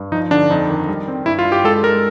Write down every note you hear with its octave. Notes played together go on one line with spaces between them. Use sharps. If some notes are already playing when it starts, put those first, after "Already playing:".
Already playing: G2
F3 D#4
D3 D4
F2 D#4
D#3
G3
C4
G2 E4
F4
G2
G4
G#3 A4
G#3 A#4